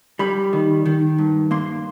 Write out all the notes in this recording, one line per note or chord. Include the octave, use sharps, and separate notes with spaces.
G3 B5
D#3
D#3
G2
A#3 C6